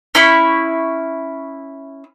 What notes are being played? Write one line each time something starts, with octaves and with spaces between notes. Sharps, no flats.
C#4 E4 B5 C#6